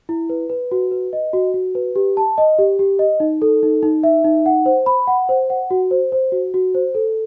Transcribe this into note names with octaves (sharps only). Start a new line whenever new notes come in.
E4
B4
B4
F#4
B4
D#5
F#4
F#4
B4
G4
A5
D#5
G4
G4
D#5
D#4
A4
D#4
D#4
E5
D#4
F#5
C5
B5
F#5
C5
F#5
F#4
C5
C5
F#4
F#4
C5
A4